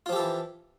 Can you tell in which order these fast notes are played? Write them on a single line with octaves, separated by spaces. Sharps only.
F4 F3 G4 A4 E3